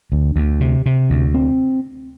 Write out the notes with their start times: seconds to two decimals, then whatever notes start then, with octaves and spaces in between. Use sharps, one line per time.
0.12 D2
0.36 D2
0.60 C3
0.86 C3
1.10 D2
1.34 C4